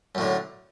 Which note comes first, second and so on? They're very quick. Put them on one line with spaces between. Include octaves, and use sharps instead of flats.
F#2 A2 D3